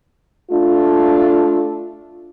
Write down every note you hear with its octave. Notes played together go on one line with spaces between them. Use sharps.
A3 D4 F4